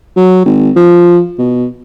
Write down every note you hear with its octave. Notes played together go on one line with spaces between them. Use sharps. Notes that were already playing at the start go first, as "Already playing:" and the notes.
F#3
G#1
F3
B2